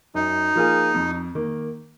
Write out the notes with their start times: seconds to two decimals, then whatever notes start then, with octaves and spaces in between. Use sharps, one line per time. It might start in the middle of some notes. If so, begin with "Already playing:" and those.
0.14 F#2 D#4
0.55 F3 A#3 F4 G#4
0.95 F2
1.35 D#3 A#3